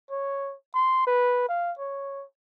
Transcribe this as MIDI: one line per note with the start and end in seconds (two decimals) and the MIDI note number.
0.11 0.55 73
0.74 1.03 84
1.07 1.44 71
1.49 1.72 77
1.79 2.25 73